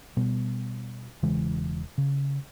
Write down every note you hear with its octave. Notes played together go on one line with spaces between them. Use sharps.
B2 G3 B3
E1 C#3 E3 G#3
C#3